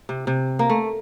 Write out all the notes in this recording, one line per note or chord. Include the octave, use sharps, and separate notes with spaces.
C3
C3
A#3
A3